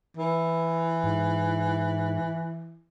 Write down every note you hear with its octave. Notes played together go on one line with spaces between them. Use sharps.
E3
G#2